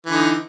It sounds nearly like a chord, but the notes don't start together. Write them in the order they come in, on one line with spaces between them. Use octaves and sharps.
E3 D3 D#4